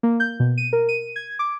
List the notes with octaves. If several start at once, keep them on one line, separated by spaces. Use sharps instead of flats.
A#3
G6
B2
D#7
A#4
D#7
G#6
D6